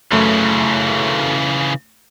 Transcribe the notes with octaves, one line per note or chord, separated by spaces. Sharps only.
F#2 C#3 E3 A3